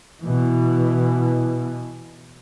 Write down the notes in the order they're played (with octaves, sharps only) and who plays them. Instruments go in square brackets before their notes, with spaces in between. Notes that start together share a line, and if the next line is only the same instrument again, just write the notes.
[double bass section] B2 E3